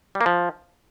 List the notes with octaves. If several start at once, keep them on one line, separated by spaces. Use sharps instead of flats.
G3
A#3
F3